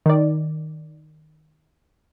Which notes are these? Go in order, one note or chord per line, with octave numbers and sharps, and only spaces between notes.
D#3 D5